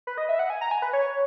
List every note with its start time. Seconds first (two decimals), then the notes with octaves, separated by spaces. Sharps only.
0.07 B4
0.18 D#5
0.29 E5
0.39 F#5
0.50 G#5
0.61 A#5
0.71 G#5
0.82 B4
0.93 C#5